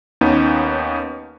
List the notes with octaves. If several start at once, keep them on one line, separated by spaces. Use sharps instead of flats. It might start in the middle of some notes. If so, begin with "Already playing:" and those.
D#2 B3 C#4 D#4